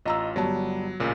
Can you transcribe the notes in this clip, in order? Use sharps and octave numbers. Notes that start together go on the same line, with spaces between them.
A1 F4 D#5 A#5 E6
G1 F#3 G3 A5
A1 A#2 C#3